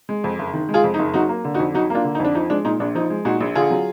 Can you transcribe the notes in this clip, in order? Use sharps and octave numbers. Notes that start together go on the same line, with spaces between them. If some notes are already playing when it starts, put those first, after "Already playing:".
G#3
F2
F#1
D#3
G#3
F4 G#4
F2
D#4
F#1
F#3 D#4 F#4
A#3
D3
D#4 F#4
F2
F#3 D#4 F#4
A#3 D4 F4
D3
D#4
F2
D4
F3 D#4
G#3 D4
A#2 D#4
A#1 D4
F3 D#4
G#3
A#2 D#4 F#4
A#1
D3 F4 G#4
F#3